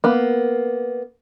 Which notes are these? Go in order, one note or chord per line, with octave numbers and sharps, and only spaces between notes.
A#3 B3